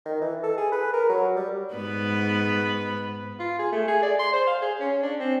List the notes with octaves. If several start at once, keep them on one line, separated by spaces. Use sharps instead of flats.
D#3
E3
A4
G#4
B4
A#4
F#3
G3
G#2 B3 B4
F4
G#4
A3
G#4
D5
C6
C5
F5
G#4
C#4
D4
C4